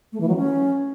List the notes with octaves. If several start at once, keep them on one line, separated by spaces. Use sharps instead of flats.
A3
E3
F#3
C#4